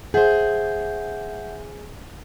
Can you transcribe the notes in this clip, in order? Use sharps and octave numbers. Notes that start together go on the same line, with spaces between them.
G#4 C5 E5 F#5 G6